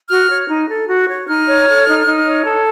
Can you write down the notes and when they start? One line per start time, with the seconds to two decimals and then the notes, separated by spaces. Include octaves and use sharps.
0.09 F#4 F6
0.29 C#5
0.49 D#4
0.69 A4
0.89 F#4
1.09 C#5
1.28 D#4 F6
1.47 C#5
1.68 A4
1.87 D#4
2.06 D#4
2.26 C#5
2.45 A4